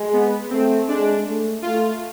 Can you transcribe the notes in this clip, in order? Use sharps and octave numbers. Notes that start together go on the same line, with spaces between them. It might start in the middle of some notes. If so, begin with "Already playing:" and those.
Already playing: G#3
B3
A3 C4
G#3 D4
A3
A3 F4